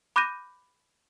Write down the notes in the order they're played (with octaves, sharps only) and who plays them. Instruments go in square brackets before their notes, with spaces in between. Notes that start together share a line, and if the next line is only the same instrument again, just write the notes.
[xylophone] B5 D6 F#6 G6 A#6 D#7